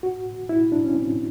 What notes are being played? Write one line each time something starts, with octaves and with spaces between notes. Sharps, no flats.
F#4
E4
D4
C#4
C4